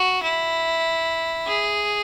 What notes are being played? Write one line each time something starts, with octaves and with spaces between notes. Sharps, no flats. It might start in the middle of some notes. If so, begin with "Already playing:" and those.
Already playing: F#4
E4
G#4